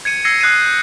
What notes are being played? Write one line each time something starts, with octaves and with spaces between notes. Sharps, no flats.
G#6 C#7 D#7
E6 G#6 A#6 C7 C#7 D#7
D#6 F#6 G#6 C7 D#7
G6